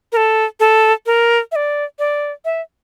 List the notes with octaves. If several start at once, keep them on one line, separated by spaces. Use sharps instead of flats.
A#4
A4
A4
A#4
E5
D5
D5
E5